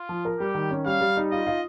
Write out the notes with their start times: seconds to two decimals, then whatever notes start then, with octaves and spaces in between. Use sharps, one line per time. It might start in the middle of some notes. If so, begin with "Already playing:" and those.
Already playing: F4
0.09 F3
0.25 A#4
0.39 G3 G4
0.55 D#3
0.71 C#4
0.85 G3 F5
1.01 G3
1.17 D#4
1.31 F4 D#5
1.47 F4